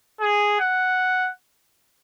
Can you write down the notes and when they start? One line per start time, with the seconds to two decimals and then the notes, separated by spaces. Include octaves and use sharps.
0.21 G#4
0.60 F#5